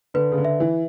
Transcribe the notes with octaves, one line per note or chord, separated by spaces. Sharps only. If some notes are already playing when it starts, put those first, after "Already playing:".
D3 B4
C#3
D3
E5
E3